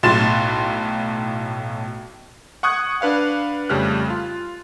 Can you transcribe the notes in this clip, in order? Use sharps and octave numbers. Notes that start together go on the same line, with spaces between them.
B1 A2 F#3 C6 A6 E7
F#5 C#6 D#6 F#6 G#6
D4 B4 F5 F#5
F2 C#3 G3 A3 F6 F#6
F4